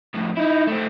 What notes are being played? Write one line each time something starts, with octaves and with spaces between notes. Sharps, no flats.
F2 A2
D#4 E4
A3 C4